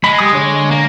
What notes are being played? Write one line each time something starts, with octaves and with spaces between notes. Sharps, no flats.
G#3 B5
G3 D#6
D3 C#5 D6
A#3